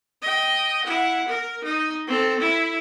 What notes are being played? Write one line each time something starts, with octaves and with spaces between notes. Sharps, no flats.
D#5 G5
E4 F#5
A#4
D#4
C4 A4
E4